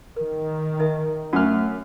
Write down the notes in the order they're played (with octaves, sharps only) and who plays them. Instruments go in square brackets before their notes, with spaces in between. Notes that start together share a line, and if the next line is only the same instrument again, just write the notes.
[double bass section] D#3 [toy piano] A#4
[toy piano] D#4 A#4 E5
[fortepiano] F#2 F6 [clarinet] A3 [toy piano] C#5 A#5